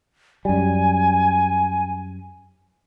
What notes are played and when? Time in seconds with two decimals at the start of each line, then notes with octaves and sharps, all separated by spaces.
0.45 F#2 G3 G#5